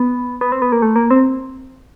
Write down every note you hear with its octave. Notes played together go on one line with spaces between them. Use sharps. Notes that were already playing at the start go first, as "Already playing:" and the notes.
Already playing: B3
B3
C4
B3
A#3
A3
A#3
C4